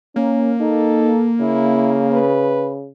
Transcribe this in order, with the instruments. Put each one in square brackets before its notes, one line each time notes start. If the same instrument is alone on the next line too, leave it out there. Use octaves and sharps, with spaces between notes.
[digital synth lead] A#3 [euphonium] C#4
[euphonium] D#4 [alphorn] A4
[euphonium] C#3 [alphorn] E4
[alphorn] B4